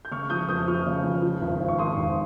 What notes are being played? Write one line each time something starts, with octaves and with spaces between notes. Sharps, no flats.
G6
C#3 C#6 F6
F3 D#6 G6
F2 D#6 G6
F3 C#6 F6
C#3
F3
F3
G#1
G#1
C#6
G#1 C6 D#6
G#1